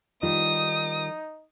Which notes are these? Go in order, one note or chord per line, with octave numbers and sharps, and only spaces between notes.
D#3 G3 D#4 F4 D#6